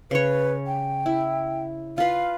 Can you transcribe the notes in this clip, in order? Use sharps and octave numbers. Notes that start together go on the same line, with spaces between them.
C#3 B4 C#5
G5
E4
F4 B4 F5